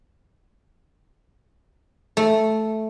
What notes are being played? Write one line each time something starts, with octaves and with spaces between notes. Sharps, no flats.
A3